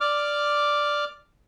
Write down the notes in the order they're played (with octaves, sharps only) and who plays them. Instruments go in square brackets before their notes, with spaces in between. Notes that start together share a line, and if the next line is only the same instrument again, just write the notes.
[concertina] D5 D6 F6